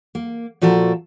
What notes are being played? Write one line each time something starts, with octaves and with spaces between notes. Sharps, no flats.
A#3
A#2 F3 F#4 A4 A#4